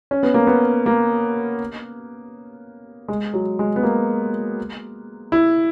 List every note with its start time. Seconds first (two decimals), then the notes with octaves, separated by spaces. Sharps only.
0.11 C#4
0.23 B3
0.34 A#3
0.47 B3
0.86 A#3
3.08 G#3
3.34 F#3
3.59 G#3
3.76 B3
3.83 A#3
5.32 E4